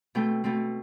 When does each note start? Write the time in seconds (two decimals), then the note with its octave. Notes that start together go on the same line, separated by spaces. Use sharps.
0.15 B2 A3 C4 G5
0.44 B2 A3 C4